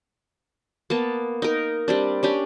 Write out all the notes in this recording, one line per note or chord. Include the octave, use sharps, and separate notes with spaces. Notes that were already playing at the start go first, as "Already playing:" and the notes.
A#3 B3 A5
D#4 A#4
G3 C4 D4
C#4 D4 G4